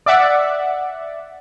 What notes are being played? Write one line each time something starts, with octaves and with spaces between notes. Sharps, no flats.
D5 E5 F#5